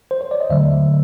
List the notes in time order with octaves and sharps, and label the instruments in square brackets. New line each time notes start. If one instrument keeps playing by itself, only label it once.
[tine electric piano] C5
C#5
D5
D#5
D#2 D3 F#3 A3 E5